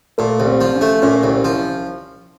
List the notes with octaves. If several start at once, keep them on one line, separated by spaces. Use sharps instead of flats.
A#2 A3
C2
C4
F3
C#4
A3
A#2 C#4
C2
F3